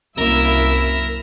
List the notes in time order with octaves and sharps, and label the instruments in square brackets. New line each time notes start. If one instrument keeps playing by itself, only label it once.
[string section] C2 E4 E6 [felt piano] F#2 A#3 [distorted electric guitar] A#4